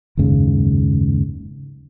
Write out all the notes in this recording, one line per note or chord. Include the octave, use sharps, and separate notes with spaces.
F#1 D#2 G#2 C#3